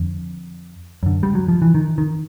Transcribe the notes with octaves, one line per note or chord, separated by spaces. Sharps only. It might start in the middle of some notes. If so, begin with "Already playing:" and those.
Already playing: F2 D3
F#2 D3
G3
F#3
F3
E3
D#3
D#3